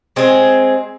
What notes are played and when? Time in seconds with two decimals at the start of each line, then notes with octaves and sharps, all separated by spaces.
0.16 G#3 C4 G#4